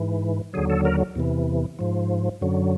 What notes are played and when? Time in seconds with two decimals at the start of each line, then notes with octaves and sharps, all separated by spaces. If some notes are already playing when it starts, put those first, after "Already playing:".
Already playing: G#2 E3
0.53 D#2 D3 F#3 G#4
0.70 A4
0.85 A#4
1.15 E2 C3 E3
1.79 G#2 F3
2.41 F#2 D3 F#3